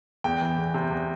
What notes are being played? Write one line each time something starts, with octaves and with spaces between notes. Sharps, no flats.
E2 G5
E3
E2
C3
E2